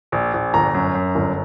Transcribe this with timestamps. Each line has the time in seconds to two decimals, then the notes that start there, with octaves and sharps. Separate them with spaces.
0.12 A#1
0.34 A#1
0.54 G1 A#5
0.74 F#2
0.95 F#2
1.15 G1